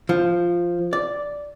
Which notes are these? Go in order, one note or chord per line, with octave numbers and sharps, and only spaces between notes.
F3
D5